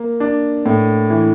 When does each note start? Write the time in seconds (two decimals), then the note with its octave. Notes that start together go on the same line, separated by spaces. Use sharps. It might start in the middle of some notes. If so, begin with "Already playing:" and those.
Already playing: A#3
0.20 D4
0.66 A2
1.10 E3